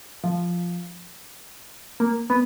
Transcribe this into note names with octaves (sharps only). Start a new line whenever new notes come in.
F3
A#3
B3